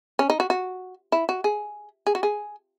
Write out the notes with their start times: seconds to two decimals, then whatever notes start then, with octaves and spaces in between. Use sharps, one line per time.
0.19 C#4
0.30 D#4
0.40 F#4
0.50 F#4
1.12 E4
1.29 F#4
1.44 G#4
2.07 G#4
2.15 F#4
2.23 G#4